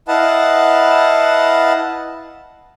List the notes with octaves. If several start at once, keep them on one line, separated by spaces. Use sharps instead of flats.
E4 B4 D#5 F5 F#5 A5